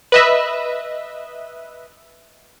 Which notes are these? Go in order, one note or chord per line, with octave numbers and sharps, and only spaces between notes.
B4 D#5 E5